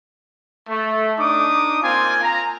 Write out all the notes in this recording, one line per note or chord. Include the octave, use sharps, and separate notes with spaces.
A3
D4 D#4 D6 D#6
A#3 C4 F4 G#5
A#5